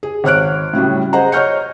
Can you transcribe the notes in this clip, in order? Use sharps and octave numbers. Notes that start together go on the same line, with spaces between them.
G#4
G#1 C#5 F6 F#6 D7
A2 C#3 F#3 G3
G#4 C5 D#5 F#5 A#5
C#5 D#5 C#6 F6 G6 C#7